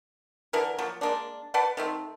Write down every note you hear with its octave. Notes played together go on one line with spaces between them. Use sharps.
D3 E3 D4 A#4
F3 F#3 A#3
G#3 A#3 D4
B4 D5 F#5 A5
D#3 A3 C4